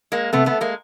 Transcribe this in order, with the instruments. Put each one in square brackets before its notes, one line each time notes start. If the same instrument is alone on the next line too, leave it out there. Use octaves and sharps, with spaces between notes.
[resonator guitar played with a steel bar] G#3 A#3
[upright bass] C3 [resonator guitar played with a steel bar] A3 B3
[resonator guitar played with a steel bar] A3 B3
G#3 A#3